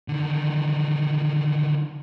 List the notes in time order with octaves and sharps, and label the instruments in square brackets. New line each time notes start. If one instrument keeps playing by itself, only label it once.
[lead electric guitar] D3 D#3